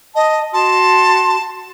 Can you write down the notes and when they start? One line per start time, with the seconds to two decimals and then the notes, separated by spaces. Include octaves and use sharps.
0.15 D#5 A5
0.53 F#4 A5 C6